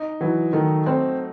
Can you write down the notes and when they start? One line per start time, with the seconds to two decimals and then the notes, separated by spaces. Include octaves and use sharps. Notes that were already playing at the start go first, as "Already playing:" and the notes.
Already playing: D#4
0.21 E3 F#3
0.53 D#3 A3
0.86 A3 C4